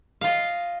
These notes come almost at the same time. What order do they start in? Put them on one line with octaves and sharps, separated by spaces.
F5 F4 D#5